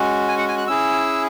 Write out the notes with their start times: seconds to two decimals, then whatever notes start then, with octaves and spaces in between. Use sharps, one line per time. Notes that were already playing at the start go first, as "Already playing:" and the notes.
Already playing: G#3 C#4 F#4
0.28 G#5
0.38 F#5
0.49 G#5
0.58 F#6
0.67 C#4 E4 G#4 E6